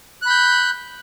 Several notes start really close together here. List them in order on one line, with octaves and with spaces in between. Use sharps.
F#6 B5 G6